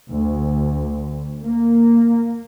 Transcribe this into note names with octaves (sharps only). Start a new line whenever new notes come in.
D2
A#3